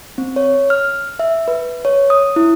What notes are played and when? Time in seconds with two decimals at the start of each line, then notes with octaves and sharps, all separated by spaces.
0.18 C4
0.36 C#5
0.70 F6
1.19 E5
1.48 B4
1.85 C#5
2.10 D#6
2.36 E4